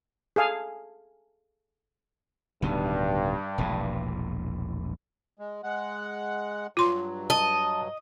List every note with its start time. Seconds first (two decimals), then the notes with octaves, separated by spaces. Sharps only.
0.36 G#4 A4 F5 G#5
2.62 D1 G2 B2 D#3
3.58 E1 A#1 A2
5.39 G#3
5.63 G#3 F#5
6.77 G2 F#3 F4 C6
7.30 D#5 A5